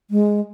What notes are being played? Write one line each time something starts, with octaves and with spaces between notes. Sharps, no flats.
G#3